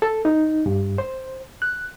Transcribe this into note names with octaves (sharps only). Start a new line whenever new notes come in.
A4
D#4
G2
C5
F#6